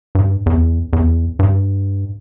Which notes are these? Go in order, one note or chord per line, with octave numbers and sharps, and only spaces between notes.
G2
E2
E2
G2